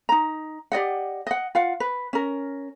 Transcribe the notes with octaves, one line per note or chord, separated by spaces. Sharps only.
D#4 A#5
G4 D5 D#5 F#5
D#5 F#5
F4 F5 F#5
B4
C#4 A#4